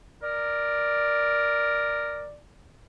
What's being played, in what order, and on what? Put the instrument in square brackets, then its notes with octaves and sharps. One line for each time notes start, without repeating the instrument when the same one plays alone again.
[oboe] A#4 [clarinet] D5